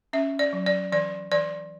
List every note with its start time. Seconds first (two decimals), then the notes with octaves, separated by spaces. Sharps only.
0.13 C#4 E5
0.39 D5
0.53 F#3
0.66 D5
0.92 E3 D5
1.32 E3 D5